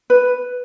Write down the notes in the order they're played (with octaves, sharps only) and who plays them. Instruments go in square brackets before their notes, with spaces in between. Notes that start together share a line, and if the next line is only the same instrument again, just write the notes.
[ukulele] B4